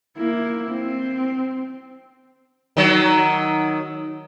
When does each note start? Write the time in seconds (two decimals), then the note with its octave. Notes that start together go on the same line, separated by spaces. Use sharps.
0.17 A#3 E4
0.70 C4
2.77 D#3 F#3